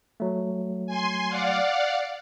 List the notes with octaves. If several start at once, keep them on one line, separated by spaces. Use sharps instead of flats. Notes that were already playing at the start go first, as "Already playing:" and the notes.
F#3 A3
G#5 C6
D5 F5 F#5